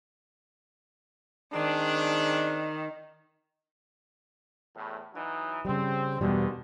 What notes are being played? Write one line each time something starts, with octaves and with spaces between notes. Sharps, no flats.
D#3 G#3 C4 D4
E2 A2
E3 F#3 D#4
C#3 G3 C4
E2 G#2 B2 D3 D#3 G3